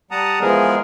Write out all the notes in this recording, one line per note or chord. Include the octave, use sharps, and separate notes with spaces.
G3 F#5 A5 A#5 D#6
E3 F3 G#3 B3 G#4 A#4